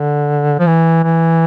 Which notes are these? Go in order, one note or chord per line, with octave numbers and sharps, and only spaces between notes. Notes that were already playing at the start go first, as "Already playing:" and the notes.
Already playing: D3
F3
E3
E3